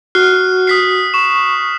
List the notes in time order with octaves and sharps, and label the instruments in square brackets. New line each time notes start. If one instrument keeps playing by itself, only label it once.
[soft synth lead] F#4 [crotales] F6 F#6 C7
[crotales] D#6 B6 C7
[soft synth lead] C#6 [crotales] E7